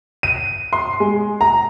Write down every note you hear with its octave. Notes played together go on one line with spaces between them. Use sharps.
D#7
C6
G#3
A#5